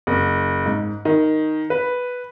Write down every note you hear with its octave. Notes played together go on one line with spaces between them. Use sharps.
F#1
G#2
D#3
B4